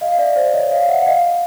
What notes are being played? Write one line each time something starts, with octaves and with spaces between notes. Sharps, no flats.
D#5 F5
D#5
D5 E5
C5 D5
C#5 D#5
D#5 F5
E5 F#5
F#5
D#5 F5